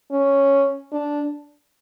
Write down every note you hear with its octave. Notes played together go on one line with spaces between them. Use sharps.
C#4
D4